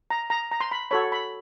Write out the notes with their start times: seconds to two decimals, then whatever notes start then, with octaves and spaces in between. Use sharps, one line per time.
0.10 A#5
0.30 A#5
0.51 A#5
0.61 C6
0.71 B5
0.91 F#4 A4 C#5 B5
1.12 B5